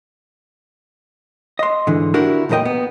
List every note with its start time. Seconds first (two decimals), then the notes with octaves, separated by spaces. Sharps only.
1.59 D#5 C6
1.87 G#2 D3 E3
2.14 D4 E4 F#4 G4 A#4
2.49 B1 E2 A#2 A#4 D#5 G5
2.65 B3